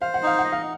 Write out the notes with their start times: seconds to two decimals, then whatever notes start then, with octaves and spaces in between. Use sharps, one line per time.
0.01 C5 F5
0.14 F#5
0.23 D#4 F5
0.39 F#5
0.44 D#5
0.52 F5